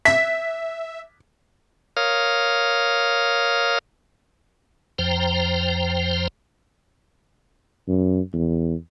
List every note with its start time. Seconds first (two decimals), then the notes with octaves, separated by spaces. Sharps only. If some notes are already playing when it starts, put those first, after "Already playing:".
0.05 E5 B6
1.97 A#4 C#5 F5 D#6 F6
4.98 F2 F3 C5 G5 A#5
7.88 F#2
8.33 E2